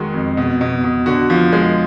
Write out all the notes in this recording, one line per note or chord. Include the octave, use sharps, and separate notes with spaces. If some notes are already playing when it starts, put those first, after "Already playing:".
Already playing: D#3 G#3 F#4
F2
B2
B2
B2
D3 F#4
F3
G#3